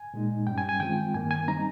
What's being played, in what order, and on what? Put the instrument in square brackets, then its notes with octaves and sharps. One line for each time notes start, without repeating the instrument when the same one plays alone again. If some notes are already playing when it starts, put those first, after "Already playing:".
Already playing: [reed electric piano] G#5
A#2 G#3 D#4
G2 G3 C#4 G5
G#5
G#5
D#3 G#3 C4 F4 G5
G2 D#3 A#3 G#5
G#5
G3 C4 D#4 A#5